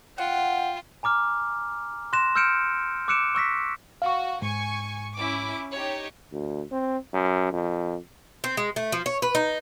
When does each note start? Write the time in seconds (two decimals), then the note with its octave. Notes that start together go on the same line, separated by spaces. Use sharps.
0.18 F4 F#5 G5
1.03 G#5 A#5 D6 F6
2.13 C6 F#6 A#6 E7
2.35 E6 F6 G6 C#7 D7 E7
3.08 D6 E6 F#6 C#7 D7 E7
3.35 C#6 E6 A#6 B6
4.02 F#4 F5 C#6
4.42 G#2 G#5 C#6
5.16 C#4 E4 D6
5.73 D#4 G4 C#5
6.32 D2
6.72 C4
7.14 F#2
7.52 F2
8.44 C4
8.57 G#3
8.76 A3
8.92 F3
9.06 C#5
9.22 B4
9.35 D#4